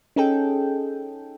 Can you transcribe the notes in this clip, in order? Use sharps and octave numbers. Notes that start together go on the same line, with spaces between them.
C#4 D#4 G#4 A4 G5